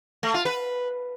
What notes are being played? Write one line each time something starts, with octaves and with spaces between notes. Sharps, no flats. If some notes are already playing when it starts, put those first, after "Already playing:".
A3
F4
B4